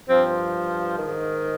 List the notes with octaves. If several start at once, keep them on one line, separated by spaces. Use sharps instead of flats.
G2 F3 C4
G#2 D#3